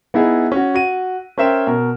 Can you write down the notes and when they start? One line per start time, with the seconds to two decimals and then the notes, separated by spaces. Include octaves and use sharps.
0.14 B3 D#4 E4 G#4
0.52 C#4 F#4
0.74 F#4 D#7
1.38 C#4 A#4 C5 E5 G5 E7
1.67 B2 A#4